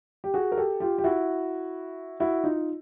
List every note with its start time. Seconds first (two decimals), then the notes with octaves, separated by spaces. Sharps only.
0.24 G4
0.34 F#4 G#4
0.52 A#4
0.57 G4 A4
0.80 F4 G4
0.98 G4
1.04 E4 F#4
2.20 E4 F#4
2.44 D#4 F4